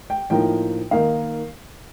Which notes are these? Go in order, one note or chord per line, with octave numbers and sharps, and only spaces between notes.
G5
A2 F3 A#3 D#4 G5
D#3 A#3 D#4 F5